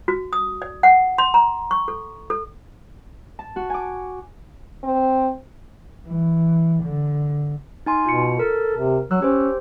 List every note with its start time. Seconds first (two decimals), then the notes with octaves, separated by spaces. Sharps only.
0.08 F#4
0.33 D#6
0.62 D5
0.83 F#5
1.18 C6
1.34 A#5
1.71 C#6
1.88 A4
2.30 A4
3.39 A5
3.56 F#4
3.70 G#5 D6
4.83 C4
6.07 E3
6.83 D3
7.86 D#4 G#5 C6
8.06 B2 F4 C#7
8.39 A4 A#4
8.77 C3
9.11 F#3 E6 F#6
9.22 C#4 G4 C5